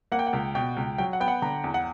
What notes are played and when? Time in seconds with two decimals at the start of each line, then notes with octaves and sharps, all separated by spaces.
0.12 A#3 F#5
0.19 G5
0.27 F#5
0.33 C#2
0.55 B2 G5
0.77 C#2
0.98 F#3 G5
1.13 F#5
1.20 B3 G5
1.28 F#5
1.42 D3 A#5
1.64 E2
1.74 F#5